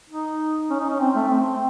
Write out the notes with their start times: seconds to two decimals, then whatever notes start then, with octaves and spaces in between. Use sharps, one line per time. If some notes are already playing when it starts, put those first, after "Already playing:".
0.10 D#4
0.70 C#4
0.80 D#4
0.90 C#4
1.00 C4
1.15 A3
1.29 C4